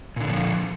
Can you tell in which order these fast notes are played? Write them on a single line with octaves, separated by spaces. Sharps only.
A#2 D3 D#3 F3